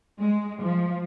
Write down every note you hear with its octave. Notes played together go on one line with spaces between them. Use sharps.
G#3
F3